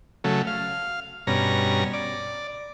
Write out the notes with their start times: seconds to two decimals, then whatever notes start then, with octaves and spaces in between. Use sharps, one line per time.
0.24 C#3 F#3 A3
0.47 F5
1.27 G2 B2 C#4 A#5
1.93 D5